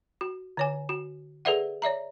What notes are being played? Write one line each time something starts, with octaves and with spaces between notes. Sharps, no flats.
F#4
D3 C#5 G#5
F#4
G#4 A4 B4 D5 E5 F#5
C#5 D5 E5 A#5